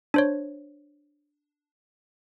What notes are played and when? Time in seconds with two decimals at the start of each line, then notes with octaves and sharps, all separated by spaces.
0.14 D4 C5 C#5